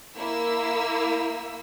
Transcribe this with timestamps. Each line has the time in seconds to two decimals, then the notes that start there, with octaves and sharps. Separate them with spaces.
0.17 A#3 E4 E6